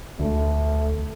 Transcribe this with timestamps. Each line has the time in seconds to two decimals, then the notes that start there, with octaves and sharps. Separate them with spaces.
0.20 D2 A3